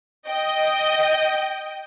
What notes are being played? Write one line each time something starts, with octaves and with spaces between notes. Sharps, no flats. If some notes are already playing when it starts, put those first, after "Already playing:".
D#5 G5